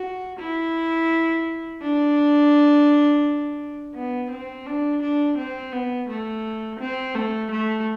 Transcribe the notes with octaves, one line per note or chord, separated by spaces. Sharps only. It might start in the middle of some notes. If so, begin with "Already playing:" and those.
Already playing: F#4
E4
D4
B3
C4
D4
D4
C4
B3
A3
C4
A3
A3